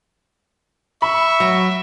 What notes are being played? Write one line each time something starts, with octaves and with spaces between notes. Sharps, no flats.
E5 B5 C#6
F#3